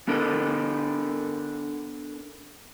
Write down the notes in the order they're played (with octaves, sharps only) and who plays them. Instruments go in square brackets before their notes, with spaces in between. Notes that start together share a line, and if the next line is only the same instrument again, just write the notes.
[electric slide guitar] B3 D4 A4 A#4